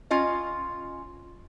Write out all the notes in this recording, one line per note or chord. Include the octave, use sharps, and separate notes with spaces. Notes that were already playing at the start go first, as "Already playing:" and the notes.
C#4 F4 D#5